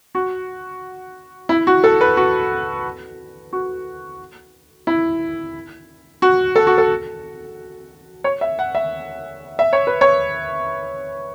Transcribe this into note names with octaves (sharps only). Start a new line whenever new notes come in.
F#4
E4
F#4
A4
B4
F#4
F#4
E4
F#4
A4
F#4
A4
C#5
E5
F#5
E5
E5
C#5
B4
C#5